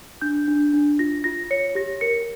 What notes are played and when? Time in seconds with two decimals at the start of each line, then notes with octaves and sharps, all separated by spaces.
0.21 D4 G6
0.48 D4
0.73 D4
0.99 F4 A#6
1.24 F4 A#6
1.51 C#5 C#7
1.75 G4 A#6
2.01 A#4 C#7